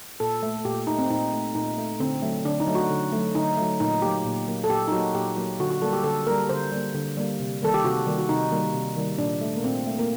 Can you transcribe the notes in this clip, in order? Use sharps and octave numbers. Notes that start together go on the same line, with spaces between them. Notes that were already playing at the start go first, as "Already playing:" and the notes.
A#2 A4
A3
A#2 G4
A3 D#4
C4
A#2 D#4
A3
A#2 D#4
A3
D3 C4
F#3 A3
D3 D4
D#4
F#3 A3
F#4
D3
F#3 A3
D3 D#4
F#3 A3
A#2 D#4
F#3 A#3 G4
A#2
F#3 A#3
A4
A#2 G4
D#4
F#3 A#3 F#4
A#2 G4
F#3 A#3
D3 F#4
F#4
G3 A#3 A4
G4
D3 A4
G3 A#3 A#4
D3 C5
G3 A#3
D3
G3 A#3
C3
D#3 G3 A#3 A4
G4
C3 F#4
D#3 G3 A#3
F#4
C3 D#4
D#3 G3 A#3
C3
D#3 G3 A#3
A#2 D4
A3
A#3
A#2 C4
A3
A#3